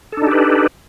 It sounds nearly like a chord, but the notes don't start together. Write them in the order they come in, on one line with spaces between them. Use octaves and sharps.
A4 D4 D#4 G4 B4